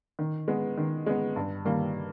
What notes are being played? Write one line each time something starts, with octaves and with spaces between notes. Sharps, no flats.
D#3
G#3 B3
D#3
G#3 B3
G2
D#3 G3 A#3